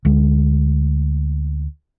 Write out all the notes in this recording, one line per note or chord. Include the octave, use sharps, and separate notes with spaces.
D2 G#3